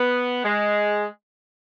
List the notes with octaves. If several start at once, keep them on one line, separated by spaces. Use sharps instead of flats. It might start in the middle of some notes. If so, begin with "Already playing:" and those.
Already playing: B3
G#3